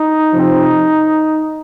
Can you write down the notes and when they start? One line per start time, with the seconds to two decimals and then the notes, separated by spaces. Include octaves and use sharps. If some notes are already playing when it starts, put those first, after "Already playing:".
Already playing: D#4
0.32 C3 F3 C4